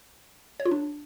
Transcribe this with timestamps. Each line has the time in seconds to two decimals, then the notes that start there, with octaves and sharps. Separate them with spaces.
0.60 C#5
0.65 F4
0.71 D4